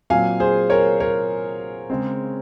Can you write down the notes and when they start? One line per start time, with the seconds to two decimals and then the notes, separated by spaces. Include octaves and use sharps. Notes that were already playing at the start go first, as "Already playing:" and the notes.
0.10 A#2 F#3 C4 F5 G#5
0.40 G#4 C5
0.70 A#4 C#5
1.00 A#4 C#5
1.90 C#3 G#3 C4